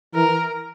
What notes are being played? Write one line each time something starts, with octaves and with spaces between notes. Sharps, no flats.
E3 A#4